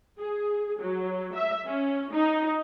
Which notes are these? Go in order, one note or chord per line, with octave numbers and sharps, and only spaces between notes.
G#4
F#3
E5
C#4
D#4